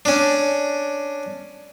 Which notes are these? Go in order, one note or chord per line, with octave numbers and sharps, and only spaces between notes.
C#4 D4